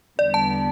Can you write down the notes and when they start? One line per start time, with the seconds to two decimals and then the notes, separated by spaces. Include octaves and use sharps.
0.19 E2 D3 G3 B3 D5
0.34 A5